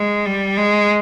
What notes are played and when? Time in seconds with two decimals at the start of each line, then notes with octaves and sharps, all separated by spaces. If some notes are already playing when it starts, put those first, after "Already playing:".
Already playing: G#3
0.25 G3
0.57 G#3